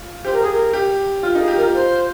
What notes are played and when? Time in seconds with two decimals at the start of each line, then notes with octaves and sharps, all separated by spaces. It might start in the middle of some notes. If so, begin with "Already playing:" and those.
Already playing: F4
0.24 G4 C5
0.32 A#4
0.42 G#4
0.50 A#4
0.74 G4
1.23 F4
1.35 D#4 A#4
1.39 G#4
1.48 G4
1.56 A#4
1.60 F4
1.74 C5